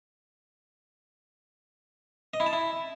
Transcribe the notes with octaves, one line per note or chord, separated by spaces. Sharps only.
D#5
E4
A5
E4